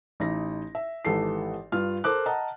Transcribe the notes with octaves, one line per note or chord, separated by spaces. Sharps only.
A1 D#4 A#6
E5
G#1 E3 G4 A4 C7
G2 F4 F6
A4 A#4 C5 D6 F#6
D#5 F#5 A5 A#5